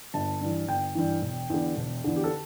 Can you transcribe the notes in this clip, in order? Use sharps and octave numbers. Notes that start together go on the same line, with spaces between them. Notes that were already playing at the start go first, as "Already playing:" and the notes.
G1 A5
G2 E3
G1 G5
G2 E3
E1
E2 D3
E1
E2 D3
G4
A4